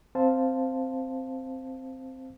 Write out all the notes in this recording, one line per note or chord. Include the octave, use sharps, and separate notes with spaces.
C4 C5 F5 A5